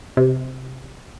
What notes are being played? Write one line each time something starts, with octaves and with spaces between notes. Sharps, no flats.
C3